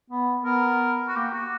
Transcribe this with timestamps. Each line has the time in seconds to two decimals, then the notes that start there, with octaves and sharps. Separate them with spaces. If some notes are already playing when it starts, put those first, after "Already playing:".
0.10 B3
0.45 B3 A#4
1.08 F#4
1.16 A#3 G4
1.33 F#4